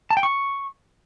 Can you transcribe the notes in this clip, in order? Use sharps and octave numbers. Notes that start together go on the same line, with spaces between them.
A5
G5
C#6